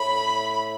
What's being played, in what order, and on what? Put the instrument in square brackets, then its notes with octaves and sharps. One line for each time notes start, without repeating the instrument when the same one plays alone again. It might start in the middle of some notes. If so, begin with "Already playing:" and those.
Already playing: [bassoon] A2 [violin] B5